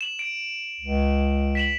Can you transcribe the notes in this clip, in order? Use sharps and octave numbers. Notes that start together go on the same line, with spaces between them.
E7 F#7
D7
C#2
B6 E7 F#7